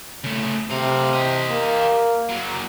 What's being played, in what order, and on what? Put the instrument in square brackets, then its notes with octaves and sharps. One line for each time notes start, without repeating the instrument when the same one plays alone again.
[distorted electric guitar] C#3 A3
[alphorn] C3 [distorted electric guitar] A3 F5
[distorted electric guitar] G4 D#5
[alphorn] A#3
[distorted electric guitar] F#3 A#3